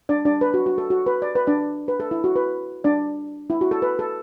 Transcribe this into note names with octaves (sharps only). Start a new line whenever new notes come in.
D4 D5
D4 D5
B4
F#4
F#4
A4
F#4
B4
D5
B4
D4 D5
B4
A4
E4
F#4
B4
D4 D5
E4
F#4
A4
B4
A4